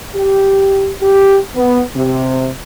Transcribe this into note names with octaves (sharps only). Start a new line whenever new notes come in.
G4
G4
B3
C3